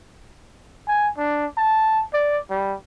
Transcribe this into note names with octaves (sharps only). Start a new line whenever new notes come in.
G#5
D4
A5
D5
G3